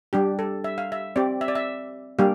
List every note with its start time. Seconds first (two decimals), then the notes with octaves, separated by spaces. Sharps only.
0.13 G3 D4 G4
0.39 A4
0.64 E5
0.78 F5
0.92 E5
1.16 C4 G4 D5
1.41 E5
1.48 D5
1.55 E5
2.19 G3 A#3 D4 G4 F5